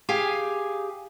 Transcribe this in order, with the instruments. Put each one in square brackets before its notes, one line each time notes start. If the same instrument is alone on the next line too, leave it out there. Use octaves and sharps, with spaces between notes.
[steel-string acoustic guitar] G4 G#4 F5 G#5